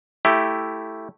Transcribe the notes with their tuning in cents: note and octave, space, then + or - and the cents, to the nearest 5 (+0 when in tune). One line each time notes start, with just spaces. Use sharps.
A3 +0 E4 +0 G4 +0